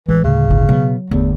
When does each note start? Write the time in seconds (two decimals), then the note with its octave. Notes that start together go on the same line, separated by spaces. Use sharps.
0.08 A1 E3 G3 G#3
0.24 D2 A2 C#3
0.49 G1 E4
0.69 B2 F#3 B3
1.11 G1 E2 A3